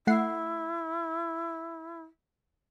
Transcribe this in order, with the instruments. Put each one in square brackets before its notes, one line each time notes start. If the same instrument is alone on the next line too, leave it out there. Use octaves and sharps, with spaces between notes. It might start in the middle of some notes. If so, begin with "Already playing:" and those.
[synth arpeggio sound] A3 F#5 C7 [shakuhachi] E4